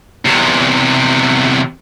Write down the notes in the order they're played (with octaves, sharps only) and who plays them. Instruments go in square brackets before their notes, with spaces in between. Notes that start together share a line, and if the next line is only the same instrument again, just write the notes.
[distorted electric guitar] E2 C3